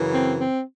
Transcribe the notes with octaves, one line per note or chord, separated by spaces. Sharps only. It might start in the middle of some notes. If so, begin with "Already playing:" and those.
Already playing: F#2 C#3 E3
C4
C4